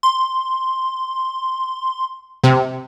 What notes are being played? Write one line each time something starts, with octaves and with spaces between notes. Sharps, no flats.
C6
C3